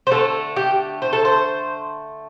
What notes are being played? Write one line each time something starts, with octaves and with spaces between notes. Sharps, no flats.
C5
D3 A3 A4
G4
C5
A4
C5